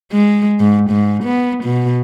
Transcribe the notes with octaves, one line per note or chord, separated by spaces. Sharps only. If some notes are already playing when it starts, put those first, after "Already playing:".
G#3
G#2
G#2
B3
B2